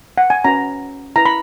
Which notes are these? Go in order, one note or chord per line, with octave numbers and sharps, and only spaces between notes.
F#5
G#5
C#4 F#4 B4 A#5
E4 B4 A#5
B5